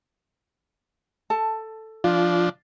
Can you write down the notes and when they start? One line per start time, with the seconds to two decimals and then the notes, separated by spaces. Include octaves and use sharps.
1.30 A4 A5
2.04 F3 D4 F4